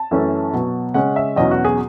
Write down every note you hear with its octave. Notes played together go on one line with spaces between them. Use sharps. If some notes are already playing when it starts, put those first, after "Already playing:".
Already playing: A5
F#2 E3 A3 C#4 E4
B2 F#3 B3
C#3 G#3 C#4 F#5
E5
E2 B2 F#3 C#4 E4 D#5
F#4
G#4